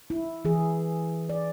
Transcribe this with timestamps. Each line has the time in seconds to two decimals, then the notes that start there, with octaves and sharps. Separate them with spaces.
0.10 E4
0.45 E3 G#4
1.29 D5